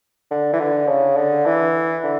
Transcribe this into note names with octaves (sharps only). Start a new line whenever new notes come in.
D3
E3
D3
C#3
D3
E3
D3